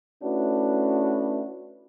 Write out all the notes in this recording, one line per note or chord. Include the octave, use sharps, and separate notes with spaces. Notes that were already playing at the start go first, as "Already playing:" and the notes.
A3 C#4 D4 E4 F#4 B4